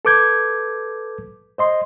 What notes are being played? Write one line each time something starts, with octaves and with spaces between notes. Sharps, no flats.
A4 B4 D6 G6 G#6
C5 D#5 C6